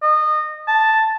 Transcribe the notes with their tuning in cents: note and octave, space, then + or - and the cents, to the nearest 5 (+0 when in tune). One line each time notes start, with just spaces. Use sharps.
D#5 -25
A5 +0